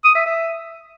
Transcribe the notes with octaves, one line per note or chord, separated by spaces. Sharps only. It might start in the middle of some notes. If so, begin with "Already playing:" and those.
D#6
E5
E5